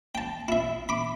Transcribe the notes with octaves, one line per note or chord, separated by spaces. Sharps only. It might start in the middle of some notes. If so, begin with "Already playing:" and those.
G5 A5
E4 E5
B5 D6